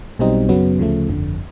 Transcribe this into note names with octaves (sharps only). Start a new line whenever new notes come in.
B1 B2 G3 C4 D#4
F#2 C#3 F#3 B3
D2 C#3 F3 A3
G1 F2 D3